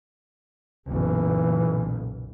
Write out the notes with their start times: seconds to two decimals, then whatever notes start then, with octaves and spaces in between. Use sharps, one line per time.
0.88 F#1 B1 A#2 E3